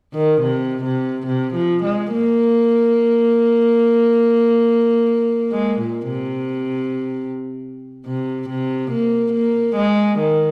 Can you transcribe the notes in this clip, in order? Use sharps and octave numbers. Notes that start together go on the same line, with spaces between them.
D#3
C3
C3
C3
F3
G#3
A#3
G#3
A#2
C3
C3
C3
A#3
A#3
G#3
D#3